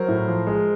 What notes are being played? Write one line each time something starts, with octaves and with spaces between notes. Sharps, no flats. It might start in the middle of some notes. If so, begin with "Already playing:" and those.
Already playing: F#3 A#4 C5
A2
F3
G#3